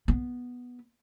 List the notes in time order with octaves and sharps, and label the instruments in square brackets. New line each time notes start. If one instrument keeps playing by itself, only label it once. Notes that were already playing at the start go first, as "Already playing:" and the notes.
[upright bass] B3